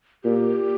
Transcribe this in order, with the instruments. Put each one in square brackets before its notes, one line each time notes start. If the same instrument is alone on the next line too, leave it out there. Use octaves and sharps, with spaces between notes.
[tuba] A#2 [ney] G4